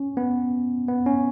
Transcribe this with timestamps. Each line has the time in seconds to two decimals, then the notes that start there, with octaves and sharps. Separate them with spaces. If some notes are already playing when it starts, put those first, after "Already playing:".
Already playing: C#4
0.17 B3
0.88 B3
1.06 C#4